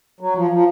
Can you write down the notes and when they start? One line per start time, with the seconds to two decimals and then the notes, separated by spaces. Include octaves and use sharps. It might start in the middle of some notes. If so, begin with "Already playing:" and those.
0.20 F#3
0.35 F3
0.51 F3